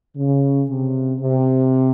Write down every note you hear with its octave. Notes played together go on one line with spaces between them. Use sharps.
C#3
C3
C3